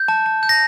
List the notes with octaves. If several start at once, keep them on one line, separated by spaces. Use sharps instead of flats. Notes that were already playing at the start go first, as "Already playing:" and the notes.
Already playing: G6
A5
A5
G6
A#6